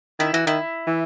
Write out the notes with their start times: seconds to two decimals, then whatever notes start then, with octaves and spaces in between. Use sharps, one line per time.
0.19 D#3 E4
0.33 E3 F#4
0.46 D#3 E4
0.87 E3